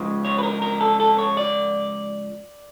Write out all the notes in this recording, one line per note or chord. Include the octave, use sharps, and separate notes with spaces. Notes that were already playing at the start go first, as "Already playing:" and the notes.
Already playing: C#2 C#3 F3 G#3
C#5
B4
A#4
A#4
A4
A4
C#5
D5